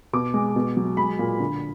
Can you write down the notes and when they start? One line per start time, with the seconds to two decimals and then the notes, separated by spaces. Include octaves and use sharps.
0.13 B2 D6
0.34 G#3
0.56 B2
0.77 F#3
0.97 G#3 B5
1.19 A#2
1.40 D3